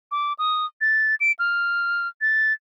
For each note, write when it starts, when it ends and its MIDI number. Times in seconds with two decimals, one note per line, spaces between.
0.11 0.33 86
0.39 0.66 87
0.81 1.15 93
1.20 1.32 98
1.39 2.08 89
2.21 2.53 93